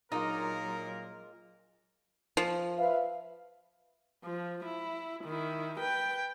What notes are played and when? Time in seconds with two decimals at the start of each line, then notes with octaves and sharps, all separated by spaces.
0.12 A#2 F#3 G#3 A#3 D#4 F4 A#4
2.37 F3
2.77 B4 E5 F5
4.24 F3
4.65 E4
5.25 D#3 E4
5.79 B4 G5